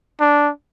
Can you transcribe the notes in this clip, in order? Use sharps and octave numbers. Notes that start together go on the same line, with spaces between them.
D4